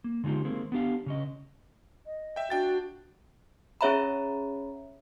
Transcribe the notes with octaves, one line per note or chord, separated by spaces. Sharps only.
A#3
D3 G#3 D#4 F4 G4
D#3 G#3 A#3 C4
B3 D4 G4 F5
C#3 C#4 D#5
D#5
E5 G5
D4 F#4 G5 A6
C#4 G#4 C#5 E5 A#5 B5